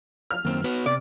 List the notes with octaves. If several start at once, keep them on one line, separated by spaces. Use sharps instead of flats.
F6
F#2 D#3 A#3 C4
B3 F#4 B4 C#5
C3 D5